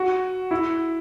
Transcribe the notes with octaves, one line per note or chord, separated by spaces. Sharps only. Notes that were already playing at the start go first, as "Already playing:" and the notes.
Already playing: F#4
E4